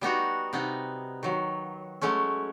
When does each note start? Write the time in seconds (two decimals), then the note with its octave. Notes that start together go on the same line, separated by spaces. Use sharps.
0.01 G3 B3 D#4 F#4
0.53 C3 B3 D#4
1.23 D#3 F#3
2.01 F#3 G#3 A3 C#4